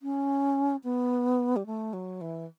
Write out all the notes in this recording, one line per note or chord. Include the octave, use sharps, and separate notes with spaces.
C#4
B3
G3
A3
F#3
E3